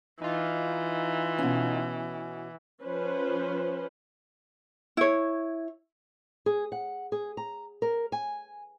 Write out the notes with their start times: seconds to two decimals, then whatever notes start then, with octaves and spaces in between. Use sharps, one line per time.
0.22 E3 D#4 F4
1.38 B2 C#4
2.83 F3 C#4 B4 C5
4.97 E4 C#5
6.46 G#4
6.72 F#5
7.12 G#4
7.37 A#5
7.82 A#4
8.12 G#5